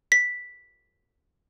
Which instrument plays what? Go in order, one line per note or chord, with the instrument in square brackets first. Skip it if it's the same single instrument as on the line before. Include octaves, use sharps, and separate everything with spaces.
[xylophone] B6